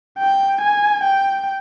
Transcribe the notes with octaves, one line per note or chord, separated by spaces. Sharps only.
G5
G#5
G5